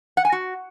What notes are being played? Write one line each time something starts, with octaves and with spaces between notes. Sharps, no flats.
F#5
G#5
F#4